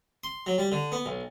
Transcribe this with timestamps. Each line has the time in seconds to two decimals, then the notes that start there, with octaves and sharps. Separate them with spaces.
0.24 C6
0.46 F#3
0.58 G3
0.72 D3
0.92 B3
1.06 B1